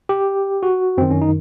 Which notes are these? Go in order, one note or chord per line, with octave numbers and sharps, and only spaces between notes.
G4
F#4
F#2 D#3 C4
C#4
D#4